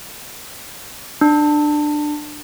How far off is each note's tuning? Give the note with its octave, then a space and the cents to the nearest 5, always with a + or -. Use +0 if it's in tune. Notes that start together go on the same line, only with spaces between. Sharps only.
D4 +20